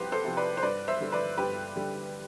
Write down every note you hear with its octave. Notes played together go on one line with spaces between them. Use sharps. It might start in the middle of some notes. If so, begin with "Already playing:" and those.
Already playing: C2 C3 F3 G4 B4 C5
A4 C5
C3 F3
B4 D5
C5
G2 B4 D5
C5 E5
D3 G3
B4 D5
G2 G4 B4
D3 G3